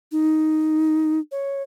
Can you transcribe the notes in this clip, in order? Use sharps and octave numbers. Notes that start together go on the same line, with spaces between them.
D#4
C#5